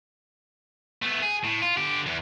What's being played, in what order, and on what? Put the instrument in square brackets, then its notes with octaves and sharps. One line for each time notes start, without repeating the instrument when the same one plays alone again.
[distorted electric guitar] A3 B3
G#4
A2
F4
D3 G4
E2